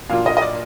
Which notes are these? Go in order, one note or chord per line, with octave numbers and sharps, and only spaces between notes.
A#2 F#3 A#3 D4 F4 F5
D#5
D#5
D5